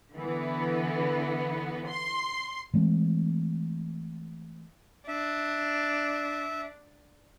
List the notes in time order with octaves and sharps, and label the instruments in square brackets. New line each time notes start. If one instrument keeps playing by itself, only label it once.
[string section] D3 E3 B3
C6
[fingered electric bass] E3 G#3 A3 C4
[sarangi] D4 [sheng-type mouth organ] E5